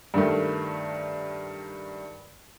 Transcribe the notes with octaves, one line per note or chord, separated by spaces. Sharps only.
G2 D#3 A3